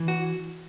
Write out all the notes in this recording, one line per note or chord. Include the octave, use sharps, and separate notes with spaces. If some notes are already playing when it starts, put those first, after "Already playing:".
Already playing: E3
F#4